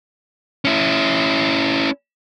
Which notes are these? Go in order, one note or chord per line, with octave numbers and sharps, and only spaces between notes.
C#4 E4